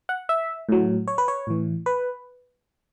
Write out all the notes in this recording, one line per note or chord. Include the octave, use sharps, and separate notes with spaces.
F#5
E5
A2 F#3
C#5
B4
C#5
A2 E3
B4